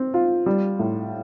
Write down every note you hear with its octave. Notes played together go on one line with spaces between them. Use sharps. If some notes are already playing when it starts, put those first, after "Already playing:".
Already playing: C4
F4
G3
A2